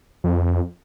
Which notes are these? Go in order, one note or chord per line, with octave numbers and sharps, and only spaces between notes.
F2